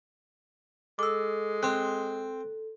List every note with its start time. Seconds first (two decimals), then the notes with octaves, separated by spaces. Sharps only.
0.99 G#3 A4 D6 E6
1.63 C4 C6 F#6